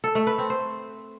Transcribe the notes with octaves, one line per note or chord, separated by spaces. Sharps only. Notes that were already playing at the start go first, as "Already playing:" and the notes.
A4
A3
B4
C4
C5